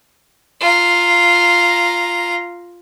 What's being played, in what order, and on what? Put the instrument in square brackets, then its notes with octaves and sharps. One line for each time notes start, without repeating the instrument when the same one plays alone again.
[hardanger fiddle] F4 A#5